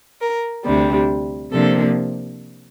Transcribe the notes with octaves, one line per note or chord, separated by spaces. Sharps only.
A#4
D2 C3 G3 D4
C3 F3 A#3 D4 A4